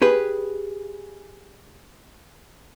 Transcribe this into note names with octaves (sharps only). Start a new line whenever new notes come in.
G4 G#4 B4